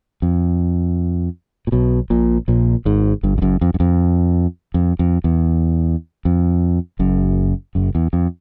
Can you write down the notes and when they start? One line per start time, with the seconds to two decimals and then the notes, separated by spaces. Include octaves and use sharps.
0.22 F2
1.67 A#2
1.72 B1 B2
2.10 A#1 A#2
2.48 A#1 A#2
2.85 G#1 G#2
3.23 G1 G2
3.38 F2
3.42 F#1 F#2
3.61 F2
3.74 F#2
3.80 F2
4.74 F2
4.99 F2
5.24 E2
6.25 F2
6.99 F#1 F#2
7.75 F#1 F#2
7.95 E2
8.13 F2